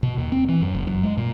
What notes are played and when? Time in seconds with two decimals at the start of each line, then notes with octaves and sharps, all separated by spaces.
0.03 B2
0.18 D#2
0.32 C4
0.49 E3
0.62 F#2
0.75 F#1
0.87 F#2
1.03 G#3
1.17 A#2